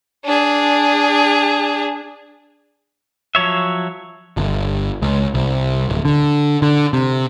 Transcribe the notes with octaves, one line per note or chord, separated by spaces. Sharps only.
D4 G#4
F3 F#3 C#5 E5
G1
C#2
C2
D1
D3
D3
C3